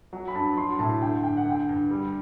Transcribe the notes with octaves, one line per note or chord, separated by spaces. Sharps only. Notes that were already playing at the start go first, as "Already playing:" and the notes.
F#3
B5
G2 A5
F#3 C6
A2 A5
D3 G5
G2 G5
F#5
D3 G5
G2
G3